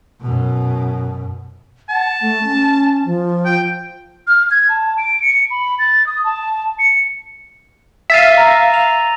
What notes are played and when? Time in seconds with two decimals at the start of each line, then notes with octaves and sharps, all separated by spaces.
0.21 F#2 B2
1.89 F#5 A5
2.21 A3
2.44 C#4
3.05 F3
3.45 G5
4.27 F6
4.51 G#6
4.69 A5
4.98 D7
5.22 C#7
5.51 B5
5.79 A6
6.07 D#6
6.24 A5
6.79 C#7
8.10 E5 F5 E6 A6 D#7
8.38 A#5 A#6
8.74 F7